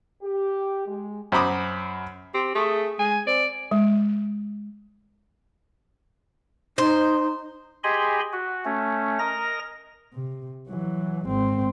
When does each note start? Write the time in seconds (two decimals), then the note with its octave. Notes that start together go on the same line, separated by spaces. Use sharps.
0.22 G4
0.86 G#3
1.32 F#2 C5 A#5 B5 D6 D#6
2.34 C4 G4
2.55 A3 G#4
2.99 G#3 G#5
3.27 C4 D5
3.71 G#3
6.78 D#4 C5
7.84 G4 G#4 D#5 G#5 B5 C6
8.33 F#4
8.65 A3 C#4
9.19 A#4 D#5 A#5 A#6
10.14 C3
10.68 E3 F#3
11.27 G#1 C4